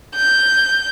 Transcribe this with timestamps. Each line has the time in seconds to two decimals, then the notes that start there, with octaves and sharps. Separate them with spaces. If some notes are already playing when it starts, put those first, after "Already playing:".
0.15 G6